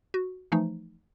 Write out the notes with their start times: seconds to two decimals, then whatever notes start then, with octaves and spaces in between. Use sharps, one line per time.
0.14 F#4
0.52 E3 F3 A3 D#4